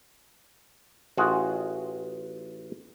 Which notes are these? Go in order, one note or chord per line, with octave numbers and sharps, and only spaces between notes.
A1 F4 F#4 G#4